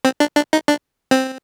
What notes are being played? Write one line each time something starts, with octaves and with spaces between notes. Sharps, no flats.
C4
D4
D4
D#4
D4
C4